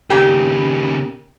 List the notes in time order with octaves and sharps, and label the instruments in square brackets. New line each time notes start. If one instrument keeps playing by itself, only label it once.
[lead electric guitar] D#2 C#3 [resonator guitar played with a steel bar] A#2 G4